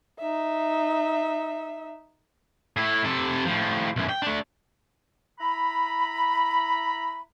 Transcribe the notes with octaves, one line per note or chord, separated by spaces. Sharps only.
D#4 E5
A2 E4
C3 A4
A2 F3
B1 F#2
G5
A3 D4
E4 A#5 B5